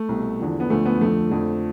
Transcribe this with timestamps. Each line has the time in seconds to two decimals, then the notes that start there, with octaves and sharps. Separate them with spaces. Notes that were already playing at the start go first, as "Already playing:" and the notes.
Already playing: A3
0.09 C2 B2
0.40 E2 D3 F3
0.60 B3
0.70 D2 D3 F3 A3
0.85 B3
1.01 F2 D3 F3 A3
1.31 F2 D3 F3